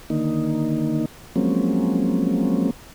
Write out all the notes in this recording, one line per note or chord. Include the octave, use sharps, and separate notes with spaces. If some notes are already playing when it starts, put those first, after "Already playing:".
D3 D#3 A#3 D#4
F3 F#3 G#3 A#3 C4 C#4